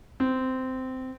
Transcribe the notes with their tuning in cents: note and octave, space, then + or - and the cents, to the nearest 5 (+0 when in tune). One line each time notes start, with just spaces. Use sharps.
C4 -15